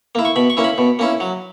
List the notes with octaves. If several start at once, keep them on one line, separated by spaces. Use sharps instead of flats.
A#3 E4
C#6
B2 B5
C#6
A#3 C#4 E4
B5
B2
A#3 C#4 E4
F#3